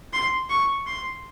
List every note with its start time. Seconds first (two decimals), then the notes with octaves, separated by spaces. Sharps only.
0.13 C6
0.50 C#6
0.86 C6